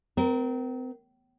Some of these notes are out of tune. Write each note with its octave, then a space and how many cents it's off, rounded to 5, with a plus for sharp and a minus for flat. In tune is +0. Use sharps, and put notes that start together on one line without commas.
C4 -35 A#4 +5